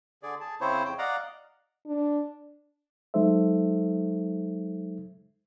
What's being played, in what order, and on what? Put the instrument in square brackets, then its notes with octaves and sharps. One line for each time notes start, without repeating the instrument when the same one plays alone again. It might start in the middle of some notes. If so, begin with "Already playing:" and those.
[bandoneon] D3 G#4 D5
G#4 A5
C#3 C4 E4 C5 C#5
F2 G5 G6
D5 D#5 F5 F#5 A#5
[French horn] D4
[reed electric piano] F#3 G#3 D#4 A4 C5 E5